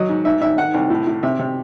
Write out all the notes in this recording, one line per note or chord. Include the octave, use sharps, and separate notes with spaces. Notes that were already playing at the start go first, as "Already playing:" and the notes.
Already playing: F#3 D#5
G#2
G#2 E5
G#2 E5
D#3 F#5
C2
A2
A2
C3 E5
C3